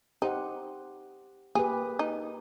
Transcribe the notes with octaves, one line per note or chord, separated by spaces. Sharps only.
D#4 G4 C5 F#5
A#3 G4 G#4 B4
D#4